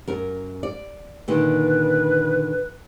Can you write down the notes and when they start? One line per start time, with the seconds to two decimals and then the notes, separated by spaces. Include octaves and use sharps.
0.08 F#2 A#4
0.63 D5
1.28 A#2 D3 D#3 B4